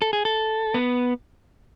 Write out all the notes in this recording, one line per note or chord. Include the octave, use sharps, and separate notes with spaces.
A4
G#4
A4
B3